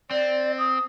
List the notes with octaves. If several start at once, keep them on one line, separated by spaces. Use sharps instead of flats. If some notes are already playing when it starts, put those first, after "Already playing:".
C4 D5
D#6